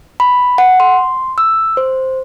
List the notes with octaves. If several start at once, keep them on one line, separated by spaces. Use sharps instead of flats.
B5
F#5
C6
E6
C5